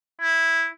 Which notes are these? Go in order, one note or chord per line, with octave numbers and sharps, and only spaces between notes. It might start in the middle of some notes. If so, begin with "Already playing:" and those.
E4